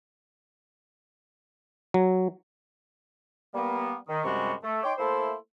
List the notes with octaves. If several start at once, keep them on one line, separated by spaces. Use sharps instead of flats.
F#3
G3 A#3 B3
D#3
F#2 C3 G3 G#3 F#4 C#6
A3
D#4 C#5 G5 C6 D6
A3 A#3 E4 A4 C5